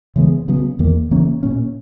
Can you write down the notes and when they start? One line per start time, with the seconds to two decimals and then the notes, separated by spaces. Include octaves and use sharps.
0.16 C#3 E3 G#3 B3
0.48 C#3 F#3 B3
0.79 E2 D#3 A#3
1.11 C#3 E3 A#3 C#4
1.43 A#2 A#3 C#4